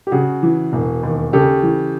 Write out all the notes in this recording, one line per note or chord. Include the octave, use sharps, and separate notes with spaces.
G4
C#3 F#4 G#4
E3
E1
D#2
C#3 G4 A4
E3